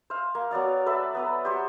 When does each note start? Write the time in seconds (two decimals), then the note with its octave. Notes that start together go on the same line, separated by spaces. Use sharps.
0.10 C5 F5
0.35 A#3
0.51 F#3 B3 D5 F5
0.86 A4 B4 D5 E5
1.15 B3 B4 A#5
1.45 G4 C5 F#5